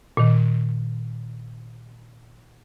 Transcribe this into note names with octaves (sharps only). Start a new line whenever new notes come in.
A#2 D#3